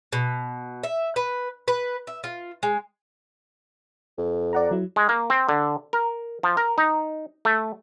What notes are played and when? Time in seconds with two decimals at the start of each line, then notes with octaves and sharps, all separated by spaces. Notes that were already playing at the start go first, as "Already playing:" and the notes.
0.13 B2
0.83 E5
1.16 B4
1.68 B4
2.07 E5
2.24 F4
2.63 G#3
4.18 F2
4.53 D5 F#5 A#5
4.71 F#3 E4
4.96 G#3
5.09 A#3
5.30 C4
5.49 D3
5.93 A#4
6.43 F3
6.57 A#4
6.78 D#4
7.45 A3